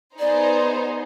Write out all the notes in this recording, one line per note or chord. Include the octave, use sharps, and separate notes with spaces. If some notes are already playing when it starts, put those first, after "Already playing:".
B3 D#4 G#4 C5 D5